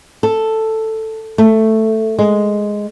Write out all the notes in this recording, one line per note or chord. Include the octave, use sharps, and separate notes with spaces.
A4
A3
G#3